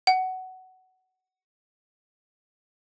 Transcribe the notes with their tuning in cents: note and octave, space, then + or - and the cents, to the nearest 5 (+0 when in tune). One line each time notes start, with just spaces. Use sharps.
F#5 +15